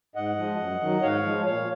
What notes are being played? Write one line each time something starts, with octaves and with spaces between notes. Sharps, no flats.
G#2 D#5 F#5
F3 G#3
F#2
D#3 F#3
G#2 C#5 F5
F3 G#3
A#2 C#5 F5